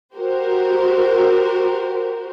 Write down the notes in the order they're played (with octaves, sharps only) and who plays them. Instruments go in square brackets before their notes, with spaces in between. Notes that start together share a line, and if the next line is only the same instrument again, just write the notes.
[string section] F#4 G4 A#4 C5